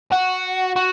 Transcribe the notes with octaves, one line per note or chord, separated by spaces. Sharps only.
F#4
F#4